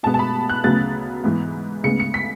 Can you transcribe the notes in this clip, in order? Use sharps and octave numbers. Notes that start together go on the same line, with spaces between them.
B2 G#3 B3 A5
A5
B5
F#6
D2 C#3 F#3 B3 A6
G#2 E3 B3
D2 C#3 G#3 B3 C#7
C#7
B6